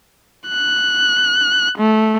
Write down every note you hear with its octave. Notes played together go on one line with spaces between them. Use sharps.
F#6
A3